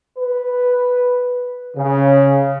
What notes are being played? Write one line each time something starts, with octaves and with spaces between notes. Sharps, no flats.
B4
C#3